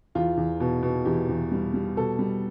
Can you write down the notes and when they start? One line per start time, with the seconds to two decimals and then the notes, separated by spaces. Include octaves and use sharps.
0.15 E2 F4
0.37 E2
0.60 B2
0.83 B2
1.05 E2 G4
1.29 E2
1.52 G3
1.74 G3
1.97 B2 A4
2.19 G3